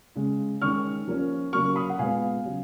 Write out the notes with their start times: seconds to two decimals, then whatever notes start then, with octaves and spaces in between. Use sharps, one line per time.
0.16 C#3 G#3 C#4
0.61 D#3 G#3 C#4 C#6 F6
1.08 F3 A#3 C#4
1.53 C#3 F#3 A#3 C#4 C#6 F6
1.76 B5 D#6
1.90 F#5
1.99 A#2 G#3 B3 F5 G#5
2.45 C#3 F#3 C#4